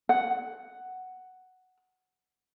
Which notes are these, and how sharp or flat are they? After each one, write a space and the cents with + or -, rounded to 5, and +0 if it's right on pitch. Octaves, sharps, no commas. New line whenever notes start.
F#5 +5